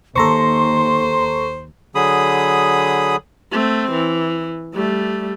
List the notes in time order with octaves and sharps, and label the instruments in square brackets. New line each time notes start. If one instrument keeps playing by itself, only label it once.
[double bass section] D#2 [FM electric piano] A4 A#5 C#6 [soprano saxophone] C5 [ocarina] C6
[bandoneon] D3 F#3 G#4 B5 D#6
[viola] A3 C4
E3
G3 A3